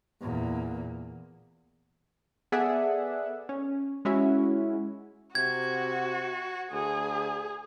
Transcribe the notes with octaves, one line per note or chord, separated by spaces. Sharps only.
E2 A#2
B3 G#4 A4 D5 E5 F#5
C#4
G#3 C#4 E4 F#4
C3 F#4 G#6
D2 G#4